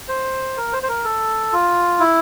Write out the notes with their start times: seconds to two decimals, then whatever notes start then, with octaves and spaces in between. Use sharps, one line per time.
0.08 C5
0.57 A#4
0.73 C5
0.83 C5
0.89 A#4
1.04 A4
1.53 F4
2.00 E4